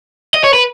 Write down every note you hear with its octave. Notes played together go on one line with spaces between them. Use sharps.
D#5
C#5
B4